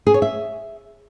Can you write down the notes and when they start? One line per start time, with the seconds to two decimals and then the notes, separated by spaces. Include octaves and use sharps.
0.07 G#4
0.14 C#5
0.22 E5